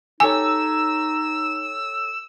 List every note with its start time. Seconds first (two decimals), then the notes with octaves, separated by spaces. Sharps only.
0.20 D#4 G4 A4 C#5 G#5 E6